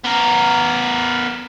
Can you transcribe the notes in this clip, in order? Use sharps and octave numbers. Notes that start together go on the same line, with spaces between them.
B3 A#4